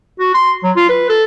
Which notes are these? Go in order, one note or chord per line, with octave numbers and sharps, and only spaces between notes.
F#4
C6
F#3
F4
B4
A4